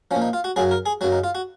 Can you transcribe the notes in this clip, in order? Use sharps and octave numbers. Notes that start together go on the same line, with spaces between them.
A#2 F3 C#4
D#4
F4
F#4
F#2 C#3 F#3 G#4
A#4
G#4
F#2 C#3 F#3 F#4
D#4
F4
F#4